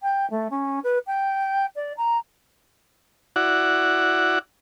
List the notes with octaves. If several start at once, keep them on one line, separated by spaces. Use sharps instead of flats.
G5
A3
C#4
B4
G5
D5
A#5
E4 F#4 D5 F#5